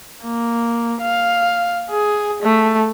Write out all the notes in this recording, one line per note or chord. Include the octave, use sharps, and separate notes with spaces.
A#3
F5
G#4
A3